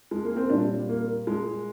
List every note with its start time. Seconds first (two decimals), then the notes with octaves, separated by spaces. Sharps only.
0.11 G#3
0.25 A#3
0.36 C4
0.50 A#2 G3 D4
0.89 A#3
1.27 G#3